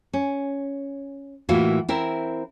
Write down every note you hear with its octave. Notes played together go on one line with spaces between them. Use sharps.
C#4
A2 E3 A#3 F4 F#4
C4 E4 A#4